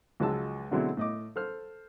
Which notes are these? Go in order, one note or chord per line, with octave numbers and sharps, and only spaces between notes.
C#2 F3 F#3 G#3 A5 E6
B2 D3 F#3 G#3 C4 E4
A2 D#5 D6
A4 C5 F6